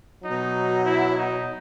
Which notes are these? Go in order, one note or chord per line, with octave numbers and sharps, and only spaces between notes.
B2 F#3 D#4
E4
D#4